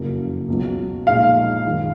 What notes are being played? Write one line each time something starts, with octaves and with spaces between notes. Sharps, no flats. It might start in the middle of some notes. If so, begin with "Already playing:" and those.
Already playing: F#1 F2 C#3 F#3 A#3
C#2 B2 F#3
A#1 A#2 G#3 D#4 F5
F#2 D#3 G#3